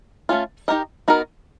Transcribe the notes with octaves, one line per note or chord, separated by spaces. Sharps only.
A3 C#4 F4
D#4 G4 A#4 D#5
B3 D#4 F#4 A#4